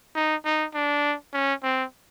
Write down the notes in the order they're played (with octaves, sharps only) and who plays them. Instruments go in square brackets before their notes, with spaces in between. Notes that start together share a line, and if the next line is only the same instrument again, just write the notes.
[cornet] D#4
D#4
D4
C#4
C4